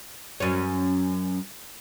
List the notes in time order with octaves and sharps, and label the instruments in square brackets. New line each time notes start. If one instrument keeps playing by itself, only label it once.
[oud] F#2 C#4